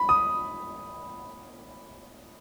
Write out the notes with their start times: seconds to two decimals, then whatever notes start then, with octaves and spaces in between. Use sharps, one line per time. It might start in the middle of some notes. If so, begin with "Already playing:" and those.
Already playing: B5
0.09 D#6